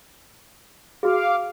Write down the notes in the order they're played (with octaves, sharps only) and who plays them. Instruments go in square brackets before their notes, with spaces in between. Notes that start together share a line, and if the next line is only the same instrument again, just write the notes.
[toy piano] F#4 G#4 [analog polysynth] F5 D6